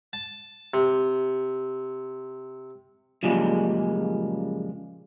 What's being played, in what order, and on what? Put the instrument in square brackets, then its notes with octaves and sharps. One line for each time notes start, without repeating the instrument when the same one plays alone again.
[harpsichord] A5
C3
[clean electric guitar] F#2 A#2 C#3 F3 G3 G#3